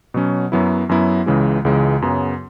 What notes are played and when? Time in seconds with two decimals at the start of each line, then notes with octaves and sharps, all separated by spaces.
0.14 B2 F#3 C#4
0.52 F#2 F#3 B3 E4
0.89 F#2 F#3 B3 E4
1.26 C#2 C#3 E3 G#3
1.65 C#2 C#3 E3 G#3
2.02 F#2 C#3 F#3 B3